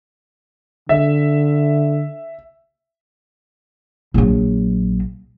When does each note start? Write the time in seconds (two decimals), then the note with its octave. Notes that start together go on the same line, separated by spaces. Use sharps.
0.89 D3 E5
4.14 A#1 F#3